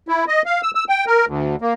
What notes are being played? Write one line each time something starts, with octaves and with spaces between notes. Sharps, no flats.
E4
D#5
F5
E6
E6
G5
A#4
D2
A#3